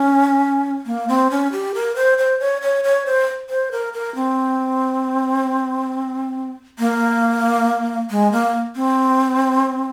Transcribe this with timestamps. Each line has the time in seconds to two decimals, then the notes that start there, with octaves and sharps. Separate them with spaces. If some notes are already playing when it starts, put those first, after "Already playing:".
Already playing: C#4
0.86 A#3
1.08 C4
1.31 C#4
1.52 G4
1.75 A#4
1.96 C5
2.18 C5
2.40 C#5
2.62 C#5
2.84 C#5
3.06 C5
3.50 C5
3.72 A#4
3.94 A#4
4.15 C4
6.79 A#3
8.11 G#3
8.32 A#3
8.76 C4